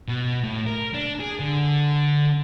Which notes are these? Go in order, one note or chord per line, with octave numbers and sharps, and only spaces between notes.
B2
A2
A#4
D4
G#4
D3